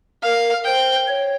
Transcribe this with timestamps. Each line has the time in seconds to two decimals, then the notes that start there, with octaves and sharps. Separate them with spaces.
0.23 A#4 F5
0.65 C5 G5
1.08 C#5